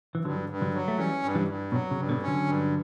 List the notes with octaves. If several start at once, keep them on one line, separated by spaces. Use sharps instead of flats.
E3
G2 D3 F#3
G2
D3 F#3
F#3
A3
E3 G3 C#4
G2
E3 G3
G2
B2 F#3
C#3
G2
B2 D3
C#4
D3 F#3
G2